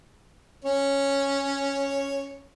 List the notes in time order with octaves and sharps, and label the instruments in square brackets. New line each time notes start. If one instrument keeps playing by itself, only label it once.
[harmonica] C#4 C#5